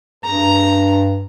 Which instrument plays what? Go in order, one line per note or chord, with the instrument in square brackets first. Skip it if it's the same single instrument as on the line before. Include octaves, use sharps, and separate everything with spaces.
[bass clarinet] G2 [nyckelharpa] A#5